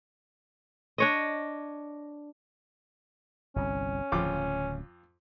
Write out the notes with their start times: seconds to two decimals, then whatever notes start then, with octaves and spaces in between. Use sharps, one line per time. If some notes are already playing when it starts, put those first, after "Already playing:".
0.98 D4 C#5 D#5
3.56 G1 C2 C#4
4.12 D1 F2 C#3 F4 D6